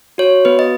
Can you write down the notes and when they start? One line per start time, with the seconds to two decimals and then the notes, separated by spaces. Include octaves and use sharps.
0.18 F#4 C#5
0.45 B3 B4
0.59 D#5